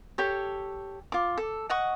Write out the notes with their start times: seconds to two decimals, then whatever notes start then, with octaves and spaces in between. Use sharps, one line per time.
0.18 G4 A4 C#5
1.12 F4 D6
1.38 A4
1.69 D#5 F#5 C#6